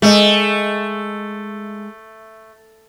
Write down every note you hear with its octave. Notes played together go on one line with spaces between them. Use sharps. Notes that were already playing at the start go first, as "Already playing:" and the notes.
G#3 A3 D#5